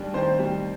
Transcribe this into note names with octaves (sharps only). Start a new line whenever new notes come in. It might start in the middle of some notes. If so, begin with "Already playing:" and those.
Already playing: D#2 G3 D4
D#3 C4 C5
G3